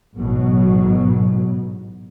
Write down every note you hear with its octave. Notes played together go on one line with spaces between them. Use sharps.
A1 G#2 B2 F#3